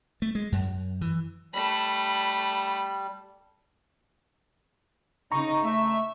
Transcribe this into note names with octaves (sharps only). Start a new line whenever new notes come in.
A3
G#3
F#2
E3
G3 A3 B5
C#3 D#4 A#5 C#6
A3 E5